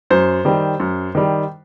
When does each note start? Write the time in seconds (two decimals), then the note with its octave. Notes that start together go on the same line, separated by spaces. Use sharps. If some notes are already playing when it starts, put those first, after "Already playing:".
0.10 F#2 C5
0.45 D#3 G3
0.80 F#2
1.15 D#3 G3